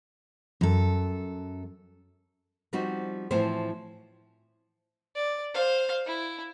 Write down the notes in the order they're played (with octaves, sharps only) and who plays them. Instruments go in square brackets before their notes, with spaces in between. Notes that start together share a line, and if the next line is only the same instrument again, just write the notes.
[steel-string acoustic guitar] F#2 A4
[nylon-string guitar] F3 G3 C4 D#4 F#4
A2 E3 F3 C4 C5
[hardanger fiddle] D5
C5 F5
E4